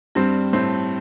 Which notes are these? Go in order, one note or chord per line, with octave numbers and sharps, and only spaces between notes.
G2 G3 C4
A2 A3 C4